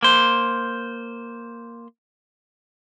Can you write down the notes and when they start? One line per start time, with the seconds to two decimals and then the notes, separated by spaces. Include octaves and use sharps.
0.03 A#3 C5